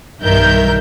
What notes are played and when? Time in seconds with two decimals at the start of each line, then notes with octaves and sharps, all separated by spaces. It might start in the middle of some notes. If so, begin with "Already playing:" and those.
0.22 B1 G2 D#3 A#4 E5 G6